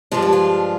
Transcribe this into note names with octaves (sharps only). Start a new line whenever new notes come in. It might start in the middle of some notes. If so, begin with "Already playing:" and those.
G2 F3 G#3 D4 F4
G4
F4